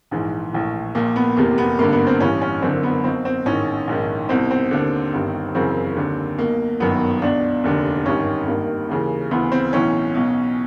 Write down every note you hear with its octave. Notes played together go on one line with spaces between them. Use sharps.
A#1 G#2 E3
A#1 A2 E3
A#1 A#2 A#3
B3
F1 E2 C3 A#3
B3
G#1 G2 D3 A#3
B3
C4
A1 G2 E3 C#4
C#4
F#1 F#2 D3 C4
B3
B1 B2 C4
C4
A1 G#2 D#3 C#4
A#1 G#2 D#3
C2 B2 C4
C4
D#2 D3
G1 G2 D#3
F#1 F#2 C#3 E3 C4
D#2 D3
B1 B2 A#3
G1 F#2 D#3 B3
C#2 B2 D4
F1 D#2 D3
G#1 G2 D#3 C#4
G#1 G2 D#3 A#3
D#2 C#3 E3
D2 C#3 E3 B3
C4
B1 A2 E3 C#4
B1 B2